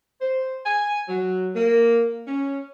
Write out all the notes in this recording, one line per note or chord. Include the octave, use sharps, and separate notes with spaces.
C5
G#5
F#3
A#3
C#4